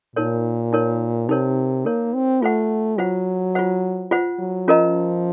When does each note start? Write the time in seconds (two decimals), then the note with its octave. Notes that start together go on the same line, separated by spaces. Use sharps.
0.16 A#2 D#4 A#4 C#5
0.73 D#4 A#4 C#5
1.28 C3 D#4 A#4 C#5
1.85 A#3 D#4 A#4 C#5
2.14 C4
2.42 A3 F4 C5 F#5
2.98 F#3 F4 C5 F#5
3.55 F4 C5 F#5
4.11 F4 C5 F#5
4.39 F#3
4.68 F3 C#4 F4 A#4 D#5 A#5